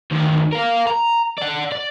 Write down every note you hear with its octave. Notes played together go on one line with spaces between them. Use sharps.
D2 D#3
A#4 F5
A#5
D5 F#5
D5